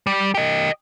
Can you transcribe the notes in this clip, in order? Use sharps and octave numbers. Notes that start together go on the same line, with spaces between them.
G3
G4 D#5